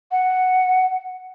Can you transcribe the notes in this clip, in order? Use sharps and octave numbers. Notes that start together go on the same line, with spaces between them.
F#5